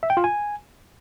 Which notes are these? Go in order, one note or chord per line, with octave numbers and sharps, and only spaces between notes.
E5
G5
F4
G#5